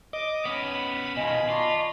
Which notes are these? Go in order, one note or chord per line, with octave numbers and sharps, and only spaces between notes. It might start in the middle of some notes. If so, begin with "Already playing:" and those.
D#5 D6
B3 C#4 B5
B2 D#3 F4 D#5 G#5
F4 D5 A5 C#6